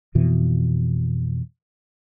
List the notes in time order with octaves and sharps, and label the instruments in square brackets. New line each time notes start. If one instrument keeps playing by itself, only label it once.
[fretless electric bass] F2 B2 E3